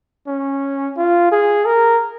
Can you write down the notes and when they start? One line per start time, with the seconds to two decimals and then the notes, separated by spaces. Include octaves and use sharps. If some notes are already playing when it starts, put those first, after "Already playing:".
0.27 C#4
0.97 F4
1.32 G#4
1.66 A#4